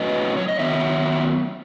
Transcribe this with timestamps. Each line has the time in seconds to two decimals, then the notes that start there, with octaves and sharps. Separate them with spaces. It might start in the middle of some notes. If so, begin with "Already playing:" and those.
Already playing: A2 F#3 C#4 B4 D#5
0.37 C#5
0.48 D#5
0.59 D#3 F#3 B3 C#5 E5